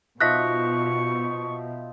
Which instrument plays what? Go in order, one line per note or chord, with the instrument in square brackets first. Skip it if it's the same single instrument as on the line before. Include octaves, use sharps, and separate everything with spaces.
[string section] B2 [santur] F3 D#4 E5 [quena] C#6 [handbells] F#6 A#6 B6